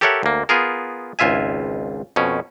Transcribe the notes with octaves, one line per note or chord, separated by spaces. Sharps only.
G4 A4 A#4 C#5 E5 F#5
D2 A#3
B3 F4 G#4 A#4
G#1 C#2 F4 E5 G#5
F2 B2 C#4